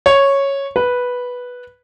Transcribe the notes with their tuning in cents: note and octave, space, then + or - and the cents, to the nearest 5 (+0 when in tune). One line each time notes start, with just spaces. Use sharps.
C#5 -5
B4 -5